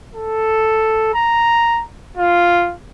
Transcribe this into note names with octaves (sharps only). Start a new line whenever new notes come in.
A4
A#5
F4